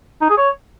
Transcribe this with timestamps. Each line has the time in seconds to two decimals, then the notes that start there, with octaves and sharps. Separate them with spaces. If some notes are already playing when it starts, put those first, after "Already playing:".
0.21 D#4
0.29 G#4
0.37 C#5